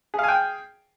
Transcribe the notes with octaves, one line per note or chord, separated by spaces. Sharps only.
G#4 F5 G5 G#5